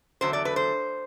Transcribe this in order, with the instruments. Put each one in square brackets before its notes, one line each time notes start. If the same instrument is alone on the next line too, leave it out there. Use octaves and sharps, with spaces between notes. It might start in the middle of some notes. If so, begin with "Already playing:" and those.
[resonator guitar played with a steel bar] E2 D3 F#3 A3 C5
D5
B4
C5